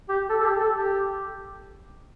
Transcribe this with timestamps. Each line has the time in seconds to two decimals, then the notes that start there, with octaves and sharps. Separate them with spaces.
0.09 G4
0.30 A4
0.41 A4
0.45 G4
0.61 A4
0.76 G4